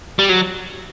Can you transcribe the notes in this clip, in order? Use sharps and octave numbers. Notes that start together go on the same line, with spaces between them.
G3
F#3